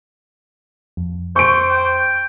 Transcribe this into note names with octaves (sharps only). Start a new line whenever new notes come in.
F2
C5 C#6 D7
G5